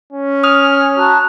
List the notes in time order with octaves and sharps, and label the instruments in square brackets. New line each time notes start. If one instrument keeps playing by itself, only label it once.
[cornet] C#4
[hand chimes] D#6 [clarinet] F6
[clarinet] F#4 [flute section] A5 A#5 F#6